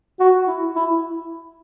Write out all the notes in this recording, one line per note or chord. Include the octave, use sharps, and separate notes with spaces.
F#4
E4
E4